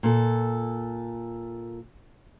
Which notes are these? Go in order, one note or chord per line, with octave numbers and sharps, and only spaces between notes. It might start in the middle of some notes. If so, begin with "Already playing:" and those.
A#2 A4